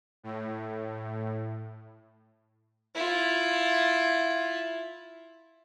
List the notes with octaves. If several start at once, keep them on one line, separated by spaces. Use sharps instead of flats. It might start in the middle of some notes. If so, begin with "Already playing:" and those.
A2
E4 F4